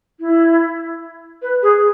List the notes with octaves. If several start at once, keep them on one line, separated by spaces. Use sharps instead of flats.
E4
B4
G#4